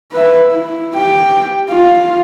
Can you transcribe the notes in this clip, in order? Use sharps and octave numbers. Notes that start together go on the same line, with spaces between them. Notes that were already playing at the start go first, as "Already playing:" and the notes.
B4 E5
E4
G4 G5
F4